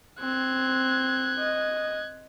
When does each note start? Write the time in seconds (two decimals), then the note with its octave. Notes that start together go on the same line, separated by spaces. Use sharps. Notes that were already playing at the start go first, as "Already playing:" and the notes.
0.20 C4 F#6 G#6
1.38 D#5